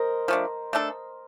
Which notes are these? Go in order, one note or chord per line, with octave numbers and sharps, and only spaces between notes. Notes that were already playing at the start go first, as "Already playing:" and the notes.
Already playing: A#4 C5 D#5
F3 A3 D4
A3 D4 A4